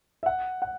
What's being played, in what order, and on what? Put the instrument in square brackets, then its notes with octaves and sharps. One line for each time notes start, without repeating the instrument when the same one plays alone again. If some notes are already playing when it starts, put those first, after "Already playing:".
[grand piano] E5
F#5
F#5